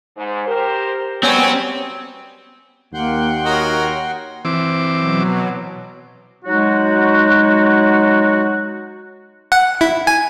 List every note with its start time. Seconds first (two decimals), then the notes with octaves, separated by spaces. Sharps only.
0.17 G#2
0.46 G4 A#4 C5
1.23 F#3 G3 B3 C4 C#5 G#5
2.94 D#2 A#3 F#5 G5 C6
3.45 F#4 A#4 C#5 D#5
4.45 E3 C4 D6
4.98 B2 F#3
6.45 F#3 G#3 D#4 F#4
9.52 F#5
9.81 E4
10.07 G#5